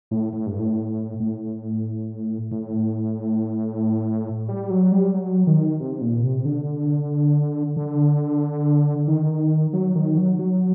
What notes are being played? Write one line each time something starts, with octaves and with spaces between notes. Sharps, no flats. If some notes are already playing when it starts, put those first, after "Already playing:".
A2
A2
G2
A2
A2
A2
G3
F#3
G3
F#3
D#3
C3
A#2
C3
D3
D3
D#3
F#3
D#3
F#3
F#3